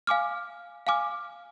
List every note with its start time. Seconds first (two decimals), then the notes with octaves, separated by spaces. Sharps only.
0.07 F5 G#5 D6 F6
0.87 F5 G#5 D6 F6